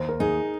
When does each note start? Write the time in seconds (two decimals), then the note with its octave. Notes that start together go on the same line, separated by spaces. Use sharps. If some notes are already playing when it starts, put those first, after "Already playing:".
Already playing: D#2 C5
0.09 A#4
0.20 D#4 G#4